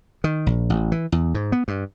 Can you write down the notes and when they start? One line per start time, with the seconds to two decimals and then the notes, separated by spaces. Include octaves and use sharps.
0.24 D#3
0.46 A#1
0.70 A1
0.92 E3
1.12 E2
1.34 G#2
1.52 B3
1.68 G2